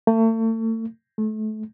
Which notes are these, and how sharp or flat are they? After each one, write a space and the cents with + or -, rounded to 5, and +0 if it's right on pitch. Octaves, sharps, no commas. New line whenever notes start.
A3 +35
A3 -30